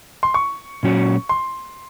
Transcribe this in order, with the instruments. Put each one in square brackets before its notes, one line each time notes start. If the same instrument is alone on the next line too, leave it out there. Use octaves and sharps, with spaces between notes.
[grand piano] C6
C#6
[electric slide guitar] A#2 F#3 C#4 F#4
[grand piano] C6